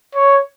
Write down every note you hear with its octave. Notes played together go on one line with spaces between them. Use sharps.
C#5